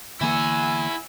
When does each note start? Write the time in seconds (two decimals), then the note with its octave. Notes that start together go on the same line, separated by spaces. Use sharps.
0.21 D3 E3 A#3 E4 F#5 G#5 E6